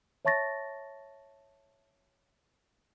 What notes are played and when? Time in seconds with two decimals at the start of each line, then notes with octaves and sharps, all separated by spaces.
0.25 C#5 E5 A5 C#6 A6 A#6